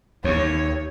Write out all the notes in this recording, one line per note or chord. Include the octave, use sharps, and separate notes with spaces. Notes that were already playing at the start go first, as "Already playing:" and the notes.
D#2 C#5